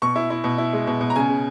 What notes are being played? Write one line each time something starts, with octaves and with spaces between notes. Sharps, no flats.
B2 C#6
E4
E4
B2
E4
G#3
B2
B2
A#5
C#3 G#5
C#3